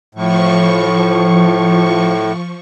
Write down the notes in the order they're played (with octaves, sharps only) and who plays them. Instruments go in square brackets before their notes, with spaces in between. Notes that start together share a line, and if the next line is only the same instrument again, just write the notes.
[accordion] A2 [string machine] F3 C#6